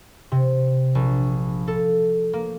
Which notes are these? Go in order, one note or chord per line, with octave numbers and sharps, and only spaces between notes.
C3
A#1
A4
A#3